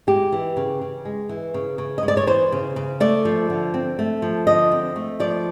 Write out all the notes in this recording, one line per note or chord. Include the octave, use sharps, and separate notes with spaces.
G#3 G4
E3
C#3
C#3
G#3
E3
C#3
C#3
D#5
G#3
D5
C#5
E3 C5
C#3
C#3
A3 D5
F3
D3
C4
A3
F3
D3 D#5
C4
A3
F3 D5